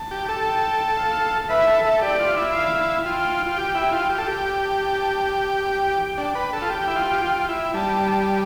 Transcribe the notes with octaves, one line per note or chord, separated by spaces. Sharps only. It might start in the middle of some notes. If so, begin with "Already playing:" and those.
Already playing: A5
G4
A4
G5
F5
B4 E5
A4
A4
G4 D5
F4
E4
F5
F4 G5
F4
G4
E4
F4
G4
A4
G4
A5
G5
D4
B4
A4
F4
G4 G5
E4
F4
G4
F4
E4
G3 A5